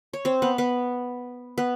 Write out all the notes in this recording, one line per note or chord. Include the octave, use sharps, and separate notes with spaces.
C#5
C4 C5
B3 B4
B3 B4
B3 B4